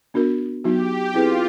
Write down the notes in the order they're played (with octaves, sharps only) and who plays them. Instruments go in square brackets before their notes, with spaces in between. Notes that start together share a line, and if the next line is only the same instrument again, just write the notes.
[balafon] B3 D4 F#4 A#4
[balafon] F#3 B3 D#4 F#4 [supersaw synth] G4
[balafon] C4 E4 G#4 B4 [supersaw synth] F4